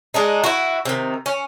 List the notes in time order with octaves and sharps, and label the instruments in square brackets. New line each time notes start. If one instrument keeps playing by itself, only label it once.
[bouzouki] G#3 D4 D#4
E4 F#4
C3 D#3
C#4